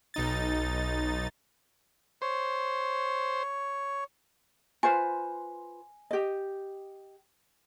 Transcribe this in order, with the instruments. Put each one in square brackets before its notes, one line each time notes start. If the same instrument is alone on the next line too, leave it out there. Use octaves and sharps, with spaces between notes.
[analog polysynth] B1 D#4 A6
[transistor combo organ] C5 [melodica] C#5
[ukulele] F4 B4 C5 [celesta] G#5
[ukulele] G4 D#5